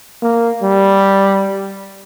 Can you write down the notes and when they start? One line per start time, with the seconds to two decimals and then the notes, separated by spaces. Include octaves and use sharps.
0.23 A#3
0.63 G3